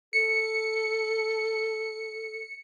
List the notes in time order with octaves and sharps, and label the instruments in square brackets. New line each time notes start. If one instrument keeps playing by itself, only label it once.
[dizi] A4 [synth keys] C#7